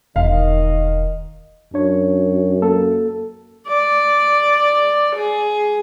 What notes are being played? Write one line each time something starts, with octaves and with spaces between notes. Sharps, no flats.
E1 D#3 D#5 F5
F#2 D4 C#5
A#3 A4
D5
G#4